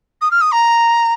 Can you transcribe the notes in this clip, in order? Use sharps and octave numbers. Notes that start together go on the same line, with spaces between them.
D#6
F6
D#6
A#5